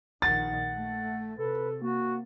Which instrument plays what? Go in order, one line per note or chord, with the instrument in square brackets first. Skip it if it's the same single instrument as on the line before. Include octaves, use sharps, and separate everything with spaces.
[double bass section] A#1 D#3 [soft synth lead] F#5 [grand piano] A6
[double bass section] A3
[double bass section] C3 [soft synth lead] A4 [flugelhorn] B4
[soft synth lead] A#3 [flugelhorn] F#4